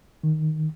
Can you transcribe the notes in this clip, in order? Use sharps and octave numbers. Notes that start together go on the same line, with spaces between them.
D#3